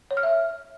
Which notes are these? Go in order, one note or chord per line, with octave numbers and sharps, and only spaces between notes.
C#5
F6
E5